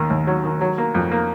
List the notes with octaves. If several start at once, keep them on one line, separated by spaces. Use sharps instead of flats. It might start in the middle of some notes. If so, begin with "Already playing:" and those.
Already playing: D#2 D#3
D#2
F#3
D#3
F#3
A#3
F2
A#3